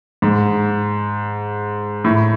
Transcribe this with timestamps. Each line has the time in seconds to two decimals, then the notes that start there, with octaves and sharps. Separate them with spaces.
0.22 G#2
2.05 A2